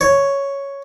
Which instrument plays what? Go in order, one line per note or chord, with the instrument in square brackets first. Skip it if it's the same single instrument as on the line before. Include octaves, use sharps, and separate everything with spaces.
[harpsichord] C#5